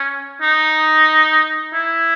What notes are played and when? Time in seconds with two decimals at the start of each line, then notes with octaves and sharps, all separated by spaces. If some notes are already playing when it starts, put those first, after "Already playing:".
Already playing: C#4
0.42 D#4
1.74 E4